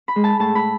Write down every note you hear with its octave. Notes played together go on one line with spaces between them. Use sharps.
B5
G#3
A5
A2 A5
B5